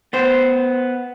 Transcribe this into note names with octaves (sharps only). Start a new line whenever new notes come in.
B3 C5